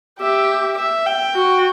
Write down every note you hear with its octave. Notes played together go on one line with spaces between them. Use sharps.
G4 E5
E5
G5
F#4